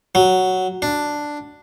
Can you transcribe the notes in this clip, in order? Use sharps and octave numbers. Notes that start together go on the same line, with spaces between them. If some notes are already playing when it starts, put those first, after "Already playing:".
F#3
D4